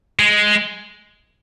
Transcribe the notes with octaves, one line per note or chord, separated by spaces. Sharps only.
G#3